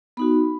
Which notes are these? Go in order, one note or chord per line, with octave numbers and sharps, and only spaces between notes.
B3 D#4 F#4 B5